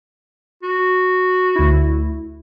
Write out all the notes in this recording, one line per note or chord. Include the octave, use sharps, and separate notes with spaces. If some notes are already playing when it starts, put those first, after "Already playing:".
F#4
D2 E4